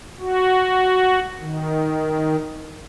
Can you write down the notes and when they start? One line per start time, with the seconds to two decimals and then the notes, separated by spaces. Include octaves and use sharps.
0.20 F#4
1.40 D#3